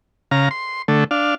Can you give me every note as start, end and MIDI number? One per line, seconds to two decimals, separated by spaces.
0.31 0.49 49
0.31 0.49 77
0.31 0.49 82
0.51 0.82 84
0.88 1.04 50
0.88 1.04 57
1.11 1.35 62
1.11 1.35 77